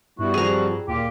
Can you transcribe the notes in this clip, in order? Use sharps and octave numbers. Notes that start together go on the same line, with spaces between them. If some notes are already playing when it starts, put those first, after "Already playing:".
G2 G3 B3 E4 F#4
F3 G3 C4 G#4 A#5
D#2 A#2 F4 G4